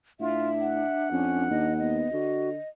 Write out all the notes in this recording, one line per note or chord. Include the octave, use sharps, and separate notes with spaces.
A2 D4 F4 E5
F#5
F2 C#4
D#2 D#5
B3 D#5
D3 F#4